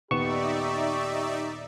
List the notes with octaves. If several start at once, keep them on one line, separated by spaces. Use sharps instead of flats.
D#1 B3 D#4 G4 D5 E5 C#6 E7